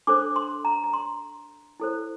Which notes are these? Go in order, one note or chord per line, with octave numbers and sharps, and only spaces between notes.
D4 A4 C5 D6
C6
A#5
A#5
C6
E4 A4 C5